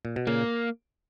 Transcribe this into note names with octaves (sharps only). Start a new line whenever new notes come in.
A#2
B2
A#2 C#3 A#3